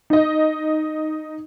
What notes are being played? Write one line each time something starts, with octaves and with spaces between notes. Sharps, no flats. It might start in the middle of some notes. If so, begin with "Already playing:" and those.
D#4 D#5